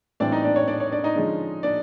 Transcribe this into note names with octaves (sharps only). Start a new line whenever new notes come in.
A2 E3 G3 C4 D4 D5
D#4 D#5
D4 D5
C#5
D4 D5
C#5
D4 D5
D#4 D#5
D3 F3 G#3 C#4
D4 D5